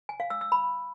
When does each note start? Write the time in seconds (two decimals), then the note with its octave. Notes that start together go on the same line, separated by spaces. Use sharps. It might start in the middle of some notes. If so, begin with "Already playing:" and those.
0.09 G#5
0.20 F5
0.30 E6
0.41 E6
0.52 B5